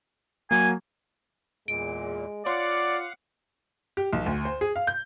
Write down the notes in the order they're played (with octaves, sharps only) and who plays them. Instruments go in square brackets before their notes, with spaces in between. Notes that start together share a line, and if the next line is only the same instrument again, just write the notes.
[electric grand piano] F#3 A#3 [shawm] G#5
[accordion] E2 A#2 [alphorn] G#3 [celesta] D7
[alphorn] F4 [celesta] C#5 C6 D6 [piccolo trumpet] D5 [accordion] F5 F#5
[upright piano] G4
B1
D2
C5
G#4
F5
G6